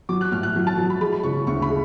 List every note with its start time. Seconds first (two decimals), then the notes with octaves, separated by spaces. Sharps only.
0.09 F#3 D6
0.21 F#6
0.32 A2 F6
0.43 F#6
0.55 F#3
0.67 A5
0.78 F#3
0.90 B5
1.01 G#3 B5
1.12 B5
1.23 C#3 C#6
1.47 D2 C#6
1.62 B5
1.70 G#3